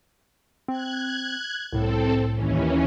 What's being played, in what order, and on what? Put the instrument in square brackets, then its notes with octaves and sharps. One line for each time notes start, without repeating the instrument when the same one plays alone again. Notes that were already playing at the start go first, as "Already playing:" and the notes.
[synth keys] C4 [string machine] F#6 G#6
[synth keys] C2 A2 [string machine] C4 A4
[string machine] D#2 E3 C#4